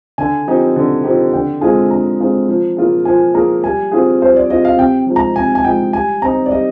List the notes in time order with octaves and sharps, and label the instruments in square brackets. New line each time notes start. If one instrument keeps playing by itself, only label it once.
[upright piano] D3 [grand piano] G#5
[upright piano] F3 C4 D#4 G4
D3
F3 C4 D#4 G4
[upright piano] D3 [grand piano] G5
[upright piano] G#3 C4 F4 G#4 [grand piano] G#5
[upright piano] D3 [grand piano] A#5
[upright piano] G#3 C4 F4 G#4
F3
A#3 F4 G#4
[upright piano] F3 [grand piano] G#5
[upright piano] A#3 F4 G#4 [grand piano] A#5
[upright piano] G3 [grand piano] G#5
[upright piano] C4 F4 G#4
[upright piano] G3 [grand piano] C5
[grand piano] D5
[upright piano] C4 F4 G#4 [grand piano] D#5
[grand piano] F5
[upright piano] C3 [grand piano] G5
[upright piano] F3 G#3 D#4
[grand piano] A#5
[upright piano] C3 [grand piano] G#5
[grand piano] G#5
[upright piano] F3 G#3 D#4 [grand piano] G5
[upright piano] G3 [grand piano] G#5
[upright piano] C4 D#4 [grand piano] A#5
[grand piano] D5
[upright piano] G3 [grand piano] D#5